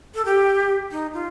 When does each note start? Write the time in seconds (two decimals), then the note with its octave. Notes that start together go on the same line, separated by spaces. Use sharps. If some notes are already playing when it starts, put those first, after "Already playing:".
0.15 A4
0.25 G4
0.91 D#4
1.14 F4